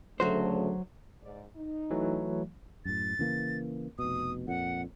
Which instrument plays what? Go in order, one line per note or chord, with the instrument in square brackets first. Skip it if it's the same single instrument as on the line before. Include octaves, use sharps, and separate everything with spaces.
[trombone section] D2 C#3 A3 [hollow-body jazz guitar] F#3 F#4 C5
[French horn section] G#2 D5
D#4
[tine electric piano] E3 F#3 A3
[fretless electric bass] F#2 A2 [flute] A6
[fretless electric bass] C#3 E3 A#3
[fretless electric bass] F1 B2 [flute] D#6
[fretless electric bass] F2 A#2 [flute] F#5